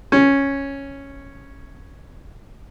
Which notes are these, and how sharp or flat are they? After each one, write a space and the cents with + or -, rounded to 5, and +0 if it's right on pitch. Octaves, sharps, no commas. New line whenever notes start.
C#4 -5